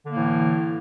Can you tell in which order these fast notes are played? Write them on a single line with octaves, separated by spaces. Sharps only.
D3 A#3 A2 E3